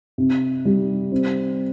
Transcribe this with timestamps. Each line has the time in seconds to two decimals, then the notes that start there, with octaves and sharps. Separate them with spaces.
0.18 C3
0.65 G3
1.12 C4